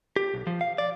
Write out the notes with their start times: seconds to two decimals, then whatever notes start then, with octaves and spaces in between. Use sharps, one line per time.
0.16 G4
0.34 B1
0.47 F3
0.61 F5
0.78 D5